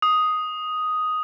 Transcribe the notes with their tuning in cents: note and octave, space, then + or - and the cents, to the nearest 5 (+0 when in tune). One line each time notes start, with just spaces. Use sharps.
D#6 +5